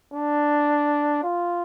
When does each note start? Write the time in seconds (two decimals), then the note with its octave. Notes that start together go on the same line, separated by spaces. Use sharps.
0.14 D4
1.23 F4